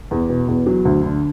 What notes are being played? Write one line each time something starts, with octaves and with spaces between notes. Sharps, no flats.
E2
B2
E2
F#3
D2
D3